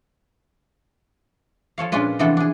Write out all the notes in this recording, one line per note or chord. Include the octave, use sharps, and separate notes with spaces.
F3 A4 C#5 F5
A#2 G#3 C#4 D4 F4 B4
C3 E3 F3 B3 D4 A4
D4 G#4